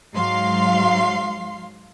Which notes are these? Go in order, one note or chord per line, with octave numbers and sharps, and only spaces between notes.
G#2 F#3 F5 C6 C7